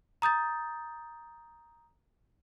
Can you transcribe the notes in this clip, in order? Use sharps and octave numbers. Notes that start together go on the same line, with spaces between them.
A#5 D#6 G6 A6